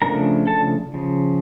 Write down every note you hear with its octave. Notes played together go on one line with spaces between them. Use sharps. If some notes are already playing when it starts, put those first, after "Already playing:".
C#3 F3 A3 D4 A#4 A#5
A4 A5
C#3 F3